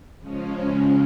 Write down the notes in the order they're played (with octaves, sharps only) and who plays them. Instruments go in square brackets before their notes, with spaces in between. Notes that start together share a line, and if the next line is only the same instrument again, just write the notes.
[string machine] C#3 F3 G#3 C#4